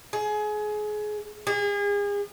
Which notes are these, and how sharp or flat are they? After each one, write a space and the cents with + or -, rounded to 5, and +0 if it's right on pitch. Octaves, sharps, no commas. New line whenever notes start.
G#4 +25
G#4 -35